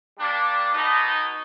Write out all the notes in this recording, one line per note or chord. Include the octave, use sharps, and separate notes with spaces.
G3 A#3 D4
B2 D#4